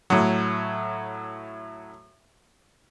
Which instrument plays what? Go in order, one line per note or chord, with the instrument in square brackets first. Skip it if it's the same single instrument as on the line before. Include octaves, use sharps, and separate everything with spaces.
[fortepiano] A2 F#3